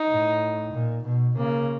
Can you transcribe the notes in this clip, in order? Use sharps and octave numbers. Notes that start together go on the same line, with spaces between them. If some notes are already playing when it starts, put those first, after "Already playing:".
Already playing: D#4
A2
A#2
B2
C#3 A#3